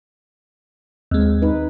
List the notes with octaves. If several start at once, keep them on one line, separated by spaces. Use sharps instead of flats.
D#2 G#3 C4
D#4 B4